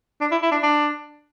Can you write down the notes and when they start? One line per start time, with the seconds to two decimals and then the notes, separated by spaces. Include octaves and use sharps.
0.21 D4
0.31 E4
0.42 E4
0.52 D4
0.63 D4